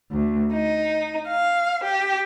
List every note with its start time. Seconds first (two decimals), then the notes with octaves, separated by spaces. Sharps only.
0.12 D2
0.53 D#4
1.29 F5
1.85 G4